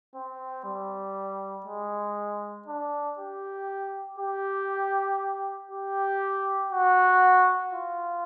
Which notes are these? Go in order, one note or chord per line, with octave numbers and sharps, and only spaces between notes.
C4
G3
G#3
D4
G4
G4
G4
F#4
F4